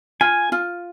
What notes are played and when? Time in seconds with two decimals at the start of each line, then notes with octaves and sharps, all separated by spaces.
0.21 F4 G#5
0.52 F4